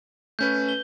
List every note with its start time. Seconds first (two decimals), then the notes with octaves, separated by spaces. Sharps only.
0.39 A3 C#4 B4 G6
0.69 G7